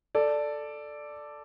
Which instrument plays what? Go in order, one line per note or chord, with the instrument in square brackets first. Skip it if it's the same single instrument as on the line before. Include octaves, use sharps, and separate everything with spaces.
[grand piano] A4 D5